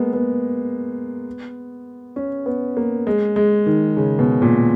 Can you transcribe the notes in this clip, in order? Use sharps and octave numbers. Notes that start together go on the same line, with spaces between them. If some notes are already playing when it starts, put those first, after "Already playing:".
Already playing: G#3 A#3 B3
B3
C#4
B3
A#3
G#3
G#3
D#3
C#3
B2
A#2